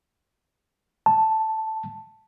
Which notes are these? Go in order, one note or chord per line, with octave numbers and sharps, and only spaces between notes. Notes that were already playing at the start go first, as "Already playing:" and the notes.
A5